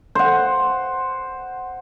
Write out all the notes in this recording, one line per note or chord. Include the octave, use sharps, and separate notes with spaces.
C5 F#5